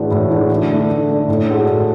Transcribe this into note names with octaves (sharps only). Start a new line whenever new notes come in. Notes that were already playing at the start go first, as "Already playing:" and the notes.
Already playing: A2 E3 G#3 D4 F#4
A2
E3 G#3 D4 F#4
D3
A3 D4
D3
A3 D4
A2
G#3 D4 F#4 A4
A2